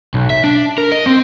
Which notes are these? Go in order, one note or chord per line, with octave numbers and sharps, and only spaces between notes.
B1
E5
D4
A#4
D#5
C4